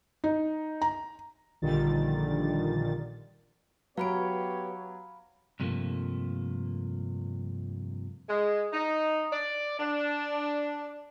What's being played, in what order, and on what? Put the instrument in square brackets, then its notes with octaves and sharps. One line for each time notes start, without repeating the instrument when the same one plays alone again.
[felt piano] D#4
A#5
[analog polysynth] A#1 A#2 D3 D#3 G3 A6
[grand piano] F#3 [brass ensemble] B3 B4 C#5 [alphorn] G4 [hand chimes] F5 B5 D7
[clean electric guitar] G2 C3 F3 F#3 A3 A#3
[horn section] G#3
D#4
D5
D4